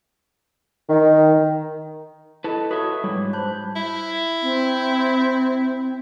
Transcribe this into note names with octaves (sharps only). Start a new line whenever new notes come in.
D#3
E4 A4 B4 D#5 A5
F#4 B4 C#5 E5 D#6
G#2 G3 C#5
C5 A5 B5 F#6 G6
E4
C4